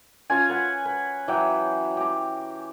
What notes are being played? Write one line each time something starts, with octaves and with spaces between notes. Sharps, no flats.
C#4 F4 G#5
B4 F#5
B4
E3 F#3 G5
G4 A#5